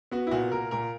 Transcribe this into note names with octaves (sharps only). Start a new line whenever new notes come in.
B3 F#4
E4
A#2 F#4
A#2 A#4
A#2 A#4